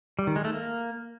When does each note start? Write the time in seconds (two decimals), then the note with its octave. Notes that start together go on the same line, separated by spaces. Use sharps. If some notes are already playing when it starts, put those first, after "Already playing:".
0.19 G3
0.27 D#3
0.36 G#3
0.45 A3
0.53 A#3